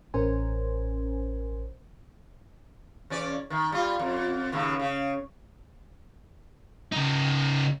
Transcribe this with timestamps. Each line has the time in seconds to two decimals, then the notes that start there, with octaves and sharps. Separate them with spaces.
0.14 A1 C#4 A#4 C5 G#5
3.10 E2 C#4 D5
3.50 D#3
3.72 G3 F4
3.99 F2
4.52 D#2 A2 C#3
4.80 C#3
6.92 C#3 D#4